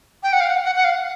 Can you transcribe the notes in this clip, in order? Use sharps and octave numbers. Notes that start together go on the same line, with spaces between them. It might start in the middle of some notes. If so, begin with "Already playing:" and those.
G5
F#5
F5
F#5
F#5
F#5
F5